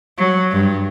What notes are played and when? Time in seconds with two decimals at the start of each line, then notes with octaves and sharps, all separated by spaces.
0.17 F#3
0.51 G2